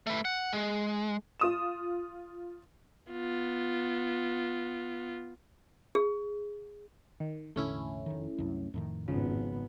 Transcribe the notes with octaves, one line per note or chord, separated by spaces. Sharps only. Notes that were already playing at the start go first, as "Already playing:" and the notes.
A3 B4
F#5
G#3
F4 D#6 E7
B3 F4
G#4
D#3
E1 A1 D3 A3 C#4 E4
F1 D#3
C2 F#2
F2 A2 D#3
G#1 C#3 F3 B3